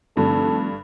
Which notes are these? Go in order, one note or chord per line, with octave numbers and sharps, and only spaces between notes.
F1 G2 D3 A4